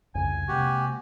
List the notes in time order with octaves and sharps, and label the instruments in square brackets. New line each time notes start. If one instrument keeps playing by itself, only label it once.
[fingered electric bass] C2 F2 C#3 [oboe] G#5
[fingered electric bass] C3 G#3 A#3 [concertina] F#4 G4